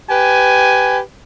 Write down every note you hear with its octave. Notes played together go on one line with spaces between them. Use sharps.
G4 B4 G#5